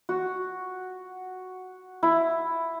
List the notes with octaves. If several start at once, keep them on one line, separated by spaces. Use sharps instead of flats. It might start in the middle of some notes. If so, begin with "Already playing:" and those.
F#4
E4